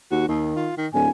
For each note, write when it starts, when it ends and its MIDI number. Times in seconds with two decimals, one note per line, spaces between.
0.11 0.26 39
0.11 0.28 66
0.28 0.51 39
0.28 0.70 51
0.56 0.73 65
0.77 0.88 51
0.94 1.09 26
0.94 1.05 45
0.94 1.10 80